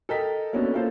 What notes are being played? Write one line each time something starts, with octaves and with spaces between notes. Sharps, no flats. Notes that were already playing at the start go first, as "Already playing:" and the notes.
A4 A#4 D#5 G5 B6
A#3 B3 C#4 D4 F#4 A4
A#3 C#4 F4 A4 C5